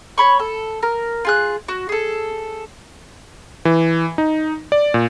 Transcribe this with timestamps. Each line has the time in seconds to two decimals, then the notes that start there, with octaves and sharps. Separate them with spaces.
0.18 C#5 B5 C#6
0.39 A4
0.83 A#4
1.25 F4 G#4 F#6
1.68 F#4
1.89 G#4 A4
3.65 E3
4.18 D#4
4.72 D5
4.94 A#2